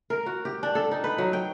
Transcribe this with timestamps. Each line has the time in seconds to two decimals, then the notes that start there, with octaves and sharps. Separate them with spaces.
0.10 A#4
0.26 F#4
0.45 G4
0.63 D4
0.75 A4
0.91 D#4
1.04 B4
1.18 F#3
1.33 G5